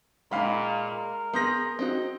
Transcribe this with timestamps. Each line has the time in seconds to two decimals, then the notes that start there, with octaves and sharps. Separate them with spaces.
0.31 A#2 G#3 D#4 F5 B5
0.92 A#4
1.33 B3 G#4 C6 G6 A#6
1.79 C4 D#4 F#4